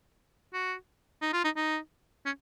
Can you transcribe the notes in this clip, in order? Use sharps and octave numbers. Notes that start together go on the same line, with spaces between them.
F#4
D#4
F4
D#4
D#4
C#4